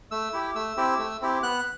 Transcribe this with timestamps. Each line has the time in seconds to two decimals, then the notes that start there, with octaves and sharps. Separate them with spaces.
0.11 A3 E6
0.33 E4 G4
0.55 A3 E6
0.77 C4 E4 G4
0.99 A3
1.21 C4 E4 G4
1.43 B3 F#6